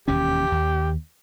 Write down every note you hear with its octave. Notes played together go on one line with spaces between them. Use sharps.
E1 D#2 C#4 G4
D#2